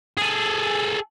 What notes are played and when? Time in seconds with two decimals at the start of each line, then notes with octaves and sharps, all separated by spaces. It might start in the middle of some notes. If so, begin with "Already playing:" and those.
0.18 G#4 A4